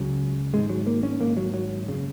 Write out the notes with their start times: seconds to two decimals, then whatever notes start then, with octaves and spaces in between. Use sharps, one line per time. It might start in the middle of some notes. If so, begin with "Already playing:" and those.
Already playing: C#2 C#3 F#3
0.53 G#1 G#2 G#3
0.70 F#3
0.87 A#3
1.03 C#4
1.20 G#1 G#2 A#3
1.37 F#3
1.54 F#3
1.87 F#1 C#3